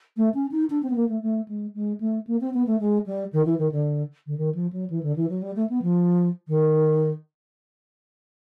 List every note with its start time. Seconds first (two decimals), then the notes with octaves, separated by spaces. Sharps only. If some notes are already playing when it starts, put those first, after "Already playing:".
0.17 A3
0.34 C#4
0.51 D#4
0.70 D4
0.83 C4
0.90 B3
0.96 A#3
1.09 A3
1.22 A3
1.48 G#3
1.75 G#3
2.00 A3
2.27 A#3
2.41 C4
2.54 B3
2.67 A3
2.80 G#3
3.06 G3
3.33 D#3
3.45 E3
3.58 D#3
3.72 D3
4.27 D3
4.37 D#3
4.55 F3
4.73 F#3
4.90 E3
5.03 D3
5.16 E3
5.30 F#3
5.42 G3
5.56 A3
5.70 B3
5.82 F3
6.48 D#3